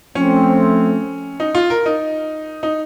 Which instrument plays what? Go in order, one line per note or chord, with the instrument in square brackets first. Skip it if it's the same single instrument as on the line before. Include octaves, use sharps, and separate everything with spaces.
[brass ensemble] F3 A3 C4 [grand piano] C#4
[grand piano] D#4
F4
A#4
D#4
D#4